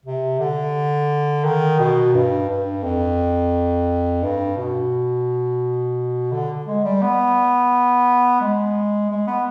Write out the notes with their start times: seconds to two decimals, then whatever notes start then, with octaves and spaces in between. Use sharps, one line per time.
0.06 C3
0.40 D3
1.44 D#3
1.79 B2
2.14 G2
2.50 G2
2.84 F2
4.23 G2
4.57 B2
6.32 D3
6.66 G#3
6.84 G3
7.02 B3
8.41 G#3
9.10 G#3
9.27 B3